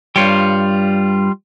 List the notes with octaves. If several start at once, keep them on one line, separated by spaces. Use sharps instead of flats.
G2 G3 F4 C#5 G5